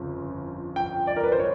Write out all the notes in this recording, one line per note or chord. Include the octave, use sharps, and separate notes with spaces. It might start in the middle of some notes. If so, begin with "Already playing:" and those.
Already playing: G1 F2 C#3 F3
G5
D5
A#4
B4
C5
C#5